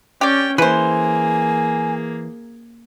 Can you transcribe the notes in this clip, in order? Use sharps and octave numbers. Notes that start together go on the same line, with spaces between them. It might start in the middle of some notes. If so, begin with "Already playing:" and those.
C#4 G4 D5 G5
E3 A#3 G#4 B4 C5 G#5